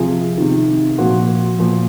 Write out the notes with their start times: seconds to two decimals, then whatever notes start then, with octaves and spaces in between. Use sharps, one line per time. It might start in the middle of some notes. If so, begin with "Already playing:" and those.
Already playing: C3 F3 F4 G#4
0.38 C3 D#3
0.98 A#2 F3 F#4
1.58 A#2 F3